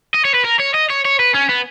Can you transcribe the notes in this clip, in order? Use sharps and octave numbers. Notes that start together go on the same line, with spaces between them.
D#5
C#5
B4
A#4
C#5
D#5
C#5
C#5
B4
C#4
B3